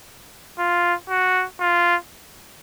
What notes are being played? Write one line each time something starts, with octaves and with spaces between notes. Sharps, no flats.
F4
F#4
F4